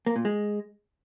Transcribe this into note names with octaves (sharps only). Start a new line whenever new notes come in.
A#3
A#2
G#3